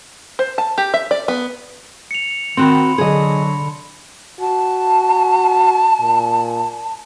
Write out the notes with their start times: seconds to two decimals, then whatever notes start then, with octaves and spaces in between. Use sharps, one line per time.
0.39 C5
0.58 A5
0.78 G4
0.94 E5
1.11 D5
1.28 B3
2.11 C#7 F7
2.57 D#3 C4 F#4 B5 C6
2.98 D3 F#3 G#4 D#5
4.40 F#4 A5
6.00 A#2